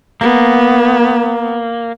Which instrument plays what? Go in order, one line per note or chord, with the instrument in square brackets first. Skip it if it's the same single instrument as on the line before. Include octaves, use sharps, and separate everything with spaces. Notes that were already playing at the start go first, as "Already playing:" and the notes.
[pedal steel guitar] A#3 [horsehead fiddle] B3